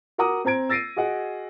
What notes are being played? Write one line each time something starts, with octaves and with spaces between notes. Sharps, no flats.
F#4 A#4 F#5 A#5 D6 D#6
C4 C5 A#5 G#6 D7
E6 A6 A#6 C7 D7 D#7
F#4 G#4 D#5 F#5